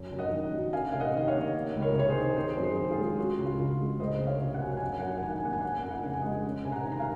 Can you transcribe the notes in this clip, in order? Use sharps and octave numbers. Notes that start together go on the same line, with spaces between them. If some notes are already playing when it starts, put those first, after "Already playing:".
Already playing: F#2
F#2
D#5 F#5
D#3
F#3
C#4 F5 G#5
C3 F5
D#5 F#5
D#3 D#5
C#5 F5
A#3
A#3
C#2
A#4 C#5
C3 C#5
G#4 C5
D#3
C4 G#4 C5
F#2
G#4 C5
D#3
F4 G#4
G#3
C#4 F#4
C#2
F4
C#3
G#3
C#2 C5 D#5
C#2
C#5 F5
C3
F#5
F#3 G#5
F#5
G#5
F#2 F#5
G#5
F#2 F#5
G#5
F#5
D#3 G#5
F#5
G#5
A#3 F#5
G#5
C#4 F#5
G#5
F#5
F2 G#5
F#5
G#5
C#3 F#5
G#5
D#5 F#5
G#3
C#4
C3 G#5
F#5 A#5
D#3
A#5
F5 G#5